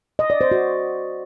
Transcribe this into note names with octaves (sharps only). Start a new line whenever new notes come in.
D#5
D5
C5
F#4